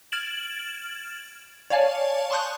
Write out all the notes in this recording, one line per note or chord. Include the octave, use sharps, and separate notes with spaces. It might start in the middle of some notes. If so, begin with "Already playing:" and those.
F6 G#6 A6 D7 E7 F#7
C#5 D5 F5 G#5 A5
A5 C6 C#6 D#6 F#6 G6